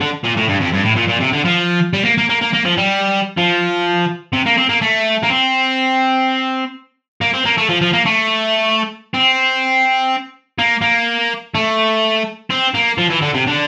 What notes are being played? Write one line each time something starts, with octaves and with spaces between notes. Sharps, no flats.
D3
A#2
A2
G2
F2
G2
A2
A#2
A#2
C3
D3
F3
G3
A#3
A#3
A#3
A#3
A#3
F3
G3
F3
C3
A#3
C4
A#3
A3
A#3
C4
A#3
C4
A#3
A3
F3
F3
A#3
A3
C4
A#3
A#3
A3
C4
A#3
F3
E3
D3
C3
D3